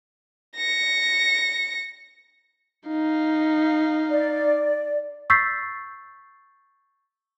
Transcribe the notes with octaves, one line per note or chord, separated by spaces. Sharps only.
A#6 C#7
D#4 F5
D5
C#6 E6 G6 A6 B6 C7